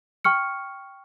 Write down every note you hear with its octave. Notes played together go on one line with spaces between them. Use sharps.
G5 C#6 F6 C#7